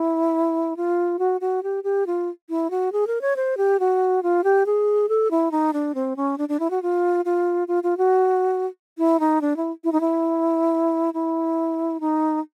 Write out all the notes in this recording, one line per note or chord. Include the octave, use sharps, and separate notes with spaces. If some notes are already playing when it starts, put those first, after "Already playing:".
Already playing: E4
F4
F#4
F#4
G4
G4
F4
E4
F#4
G#4
A#4
C#5
C5
G4
F#4
F4
G4
G#4
A4
E4
D#4
D4
C4
C#4
D4
D4
E4
F#4
F4
F4
F4
F4
F#4
E4
D#4
D4
E4
E4
D#4
E4
E4
D#4